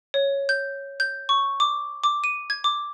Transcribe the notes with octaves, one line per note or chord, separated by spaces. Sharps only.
C#5
G6
G6
C#6
D6
D6
D#7
G#6
D6